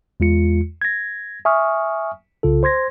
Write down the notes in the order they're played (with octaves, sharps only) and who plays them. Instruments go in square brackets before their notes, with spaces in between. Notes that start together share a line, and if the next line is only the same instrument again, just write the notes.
[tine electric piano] E2 G#3 F4 C#7
G#6 A#6
E5 G#5 C#6 D#6 F6
C2 C#3 F4 A4
C5 C6 G#6 A#6